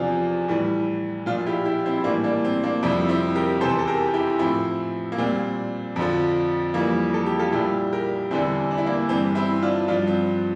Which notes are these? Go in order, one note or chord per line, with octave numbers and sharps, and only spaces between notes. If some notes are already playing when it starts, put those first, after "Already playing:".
Already playing: E2 C3 F3 D4 F4
A2 E3 G3
A#2 F3 D4 F4
E4 G4
E4 G4
C4 E4
E4
A2 E3 G3 A#3 D4
A#3 D4
C4
A#3 D4
F2 C3 G3 C4 E4
C4 E4
G4 A#4
E2 C3 E3 A4 C5
A4
G4 A#4
E4 G4
A2 F3 C4 E4
A#3
A#2 G3 C4
F2 D3 F3
F2 E3 G3 A#3
A4
G4
F4 A4
A#2 G3 E4 G4
G4 A#4
E2 D3 G3 C4 E4
D4
E4
A#3 D4
G2 E3 G3 C4
C4 E4
D4 F4
G2 F3 D4 F4
C4